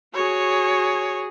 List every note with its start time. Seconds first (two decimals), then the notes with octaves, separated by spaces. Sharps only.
0.14 F#4 G#4 C#5